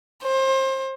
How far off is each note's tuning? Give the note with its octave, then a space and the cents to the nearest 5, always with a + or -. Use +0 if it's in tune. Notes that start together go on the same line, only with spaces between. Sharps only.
C5 +30